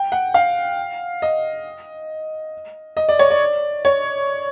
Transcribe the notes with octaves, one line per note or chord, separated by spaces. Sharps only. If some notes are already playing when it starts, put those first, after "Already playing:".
Already playing: G5
F#5
F5
D#5
D#5
D5
C#5
D5
C#5